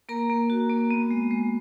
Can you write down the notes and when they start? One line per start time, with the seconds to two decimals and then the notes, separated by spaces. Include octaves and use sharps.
0.09 A#3 A#4 A#5
0.29 A#3
0.50 F#4
0.70 A#3
0.91 B3
1.11 G#3
1.31 G#3